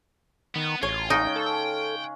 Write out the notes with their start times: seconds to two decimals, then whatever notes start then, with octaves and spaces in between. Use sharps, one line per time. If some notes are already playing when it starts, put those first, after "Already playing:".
0.56 D#3 B3
0.83 A1 F4 G#4 C#5
1.10 C#3 G#3 C#4 D#4 G5
1.36 A4